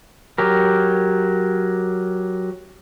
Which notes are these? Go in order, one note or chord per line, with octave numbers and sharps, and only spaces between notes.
F#3 G4 A#4